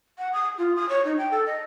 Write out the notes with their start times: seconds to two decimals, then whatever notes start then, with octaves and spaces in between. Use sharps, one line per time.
0.18 F#5
0.33 D#6
0.58 F4
0.76 D#6
0.89 C#5
1.05 D#4
1.17 G5
1.31 A4
1.46 D#5